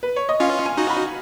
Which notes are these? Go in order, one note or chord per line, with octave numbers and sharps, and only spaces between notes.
B4
C#5
D#5
C#4 F4 F5
G#5
D#4 F#4
B5